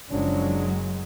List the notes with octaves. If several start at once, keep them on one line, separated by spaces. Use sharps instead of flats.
F#1 F3 F#3 G#3 C#4 D4